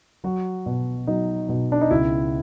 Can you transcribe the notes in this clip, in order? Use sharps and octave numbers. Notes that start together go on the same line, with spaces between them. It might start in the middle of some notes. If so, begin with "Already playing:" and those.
F#3 F#4
B2
F#3 D#4
B2
D4
D#4
C#2 E4